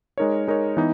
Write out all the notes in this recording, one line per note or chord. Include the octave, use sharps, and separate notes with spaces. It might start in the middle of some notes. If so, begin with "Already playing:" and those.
G#3 D#4 A#4 C#5
G#3 D#4 A#4 C#5
E3 B3 D#4